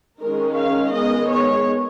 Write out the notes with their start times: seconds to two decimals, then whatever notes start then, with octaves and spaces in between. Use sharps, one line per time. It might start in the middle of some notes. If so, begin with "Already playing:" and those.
0.22 D#3 G#3 C#4 A#4
0.58 F5
0.94 D#3 G#3 B3 D#5
1.30 C#5